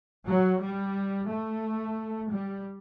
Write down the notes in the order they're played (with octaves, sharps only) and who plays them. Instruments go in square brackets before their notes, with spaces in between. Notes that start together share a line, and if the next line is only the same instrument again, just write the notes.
[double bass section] F#3
G3
A3
G3